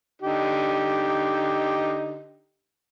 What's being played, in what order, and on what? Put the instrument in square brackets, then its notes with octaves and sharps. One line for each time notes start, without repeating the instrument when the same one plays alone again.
[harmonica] D3 D#4 G4